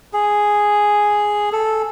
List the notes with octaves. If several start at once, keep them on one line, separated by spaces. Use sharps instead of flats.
G#4
A4